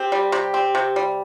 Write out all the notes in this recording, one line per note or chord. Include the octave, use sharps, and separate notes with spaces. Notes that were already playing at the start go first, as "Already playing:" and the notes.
Already playing: C4 G4
G3
C3
C4
C3
G3